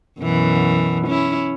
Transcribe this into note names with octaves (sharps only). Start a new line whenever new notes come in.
F#2 B2 E3
C#4 E4